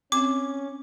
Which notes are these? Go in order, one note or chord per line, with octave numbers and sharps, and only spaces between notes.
C4 C#4 D6